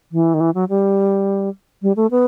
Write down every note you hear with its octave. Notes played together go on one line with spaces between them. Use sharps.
E3
D#3
E3
F#3
G3
G3
A3
B3